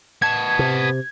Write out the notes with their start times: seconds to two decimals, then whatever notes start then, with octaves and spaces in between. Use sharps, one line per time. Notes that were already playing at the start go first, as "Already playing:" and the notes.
0.22 B3 A5 G#6
0.59 C3